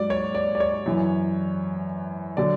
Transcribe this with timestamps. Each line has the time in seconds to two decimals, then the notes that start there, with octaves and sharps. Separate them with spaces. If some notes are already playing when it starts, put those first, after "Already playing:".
Already playing: G#2 F#3 D5
0.10 C#5
0.35 D5
0.55 D5
0.60 C#5
0.86 F#2 E3
2.37 D3 F#3 D5